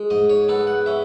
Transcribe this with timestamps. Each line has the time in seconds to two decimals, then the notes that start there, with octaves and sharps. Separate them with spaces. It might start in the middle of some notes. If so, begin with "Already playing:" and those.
Already playing: G#3
0.10 G#2 D#5
0.30 C#5
0.49 B3 A4
0.67 F#5
0.86 C#4 E5